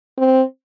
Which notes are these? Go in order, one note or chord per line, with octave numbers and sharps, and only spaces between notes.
C4